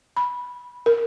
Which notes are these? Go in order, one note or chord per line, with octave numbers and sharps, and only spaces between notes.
B5
A#4